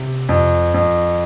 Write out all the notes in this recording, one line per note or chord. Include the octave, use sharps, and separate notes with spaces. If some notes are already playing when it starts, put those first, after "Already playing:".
Already playing: C3
F2
F2